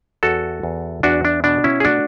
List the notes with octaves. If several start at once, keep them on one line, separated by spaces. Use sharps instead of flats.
E2 F#4 A4
E2
E2 D4 F#4
D4
B2 D4
C#4 E4
G#4
A3 D4 F#4